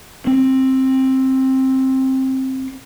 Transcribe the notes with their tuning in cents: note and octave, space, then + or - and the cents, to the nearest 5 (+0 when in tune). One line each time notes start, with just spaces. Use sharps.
C4 +15